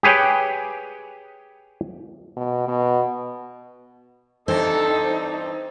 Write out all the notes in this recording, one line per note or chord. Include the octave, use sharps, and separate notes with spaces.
G4 G#4 B4 C#5 G5
B2
B2
G2 E3 C4 D#4 A4 C5